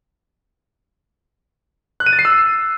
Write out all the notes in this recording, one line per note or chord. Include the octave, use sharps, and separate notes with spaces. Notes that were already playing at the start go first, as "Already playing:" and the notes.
F#6
D#7
A6
C7
E6